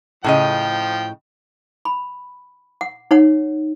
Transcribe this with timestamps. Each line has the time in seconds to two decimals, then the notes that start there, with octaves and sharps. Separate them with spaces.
0.24 A2 C#3 F3 D#5 G5
1.85 B5
2.81 F#5
3.11 D#4 C#5 F#5